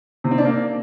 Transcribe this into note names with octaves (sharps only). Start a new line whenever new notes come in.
C3
C4
D4
A#3